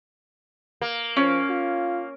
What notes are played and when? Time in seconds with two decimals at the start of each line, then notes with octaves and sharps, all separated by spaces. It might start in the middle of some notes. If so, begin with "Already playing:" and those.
0.81 A#3
1.17 F3 C#4
1.49 F4